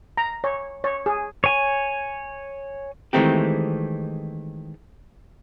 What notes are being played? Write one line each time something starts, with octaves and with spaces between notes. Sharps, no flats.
A#5
C#5
C#5
G#4
C#5 G#5
D#3 E3 G#3 A3 C4 G4